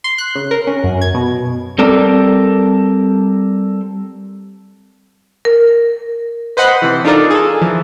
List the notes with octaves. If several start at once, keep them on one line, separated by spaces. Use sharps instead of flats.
C6
F#6
C#3
A#4
C#4
F#2
G#6
B2
G3 C4 A4 A#4 D5
A#4
B4 C5 D#5 F#5 B5
C3 E3
D4 D#4 F4 A4 A#4 D5
G#4 A4
E3 F3